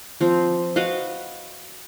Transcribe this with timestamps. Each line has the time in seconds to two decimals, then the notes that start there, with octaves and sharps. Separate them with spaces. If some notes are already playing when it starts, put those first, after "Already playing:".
0.21 F3 C4
0.76 F#4 B4 D#5 F5